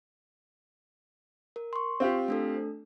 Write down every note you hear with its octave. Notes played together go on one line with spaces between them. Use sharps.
A#4
C6 C#6
C4 F4 G4
A3 D4 A4